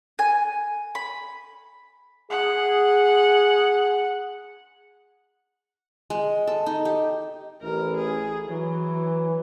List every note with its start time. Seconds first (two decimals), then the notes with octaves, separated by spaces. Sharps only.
0.19 G#5
0.95 B5
2.30 G#4 F#5
6.10 G#3
6.47 A4
6.66 D#4
6.85 G4
7.62 A1 E4 A#4
7.97 G#4
8.48 E3 F#3